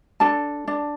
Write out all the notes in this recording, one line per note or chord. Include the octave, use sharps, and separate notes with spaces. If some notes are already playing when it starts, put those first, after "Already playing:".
D4 A4 A5
D4